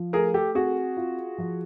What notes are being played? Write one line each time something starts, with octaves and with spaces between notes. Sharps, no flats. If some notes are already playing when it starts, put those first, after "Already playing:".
Already playing: F3
A3 G#4 A#4
G4 A4
C4 F#4 G#4
F4
F3